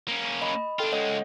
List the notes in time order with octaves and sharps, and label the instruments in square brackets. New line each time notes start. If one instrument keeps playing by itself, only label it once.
[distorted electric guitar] A#3 C#4
[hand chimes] D#5 B5
[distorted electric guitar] D4 F4 [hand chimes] A4 G5
[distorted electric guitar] C#2 G#3 [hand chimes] C#5 D#5 F#5